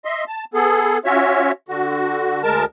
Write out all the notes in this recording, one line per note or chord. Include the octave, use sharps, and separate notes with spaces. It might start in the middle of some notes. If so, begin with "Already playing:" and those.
D#5 E5 C6
A5
B3 G#4 A4
C#4 F4 F#4 C#5 E5
D3 F#4
D2 G#3 A#4 A5